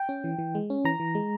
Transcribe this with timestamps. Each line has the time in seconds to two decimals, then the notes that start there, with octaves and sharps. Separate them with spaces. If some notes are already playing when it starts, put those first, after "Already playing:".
Already playing: G5
0.09 C#4
0.24 E3
0.39 E3
0.55 G#3
0.70 C#4
0.85 E3 A#5
1.00 E3
1.15 G#3